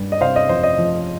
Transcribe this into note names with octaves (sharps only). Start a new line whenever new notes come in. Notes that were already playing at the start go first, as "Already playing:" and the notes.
Already playing: G2
D#5
C3 C5 F5
D#5
F2 C5
D#5
F3